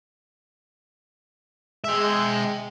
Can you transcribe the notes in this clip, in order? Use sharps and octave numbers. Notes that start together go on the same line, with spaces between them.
G#3 E5 G5